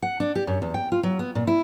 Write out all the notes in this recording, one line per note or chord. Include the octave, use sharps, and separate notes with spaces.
F#5
D4
G4
F#2
E2
G5
F4
F#3
B3
A#2
E4